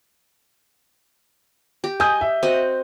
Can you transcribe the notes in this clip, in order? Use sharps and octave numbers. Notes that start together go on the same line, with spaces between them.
G4
D#5 G#5 D#6 G6
E5
C4 F#4 D#5